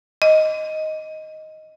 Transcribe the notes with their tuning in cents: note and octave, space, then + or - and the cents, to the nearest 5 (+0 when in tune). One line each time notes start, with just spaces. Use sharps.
D#5 +5